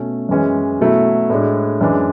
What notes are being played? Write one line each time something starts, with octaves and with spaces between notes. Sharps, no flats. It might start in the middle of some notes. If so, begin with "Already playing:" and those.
Already playing: B2 A3 C#4
F#2 E3 G#3 C#4
B2 F#3 A3 E4
A2 G#3 D4
F#2 E3 G#3 D4